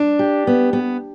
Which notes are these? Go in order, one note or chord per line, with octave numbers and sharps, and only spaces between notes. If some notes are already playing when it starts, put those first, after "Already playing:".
Already playing: D4
G4
B3
B3